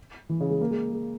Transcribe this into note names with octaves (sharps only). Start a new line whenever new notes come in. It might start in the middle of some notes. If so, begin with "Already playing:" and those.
E3
C#3
G#3
A#3
G#3
G#3